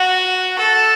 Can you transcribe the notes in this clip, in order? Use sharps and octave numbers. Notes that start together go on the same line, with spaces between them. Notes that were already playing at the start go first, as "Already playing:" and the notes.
Already playing: F#4
A4